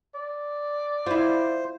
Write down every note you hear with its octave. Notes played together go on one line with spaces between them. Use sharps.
D5
E4 F4 C5